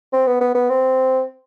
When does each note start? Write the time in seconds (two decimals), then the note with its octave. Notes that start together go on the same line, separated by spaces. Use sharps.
0.13 C4
0.27 B3
0.41 B3
0.54 B3
0.69 C4